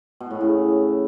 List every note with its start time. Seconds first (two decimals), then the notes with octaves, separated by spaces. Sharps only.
0.20 B2
0.31 A2
0.41 C#3